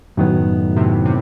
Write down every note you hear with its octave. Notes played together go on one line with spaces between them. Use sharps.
F#2 A2 D#3 F#3 B3
A2 C3
C3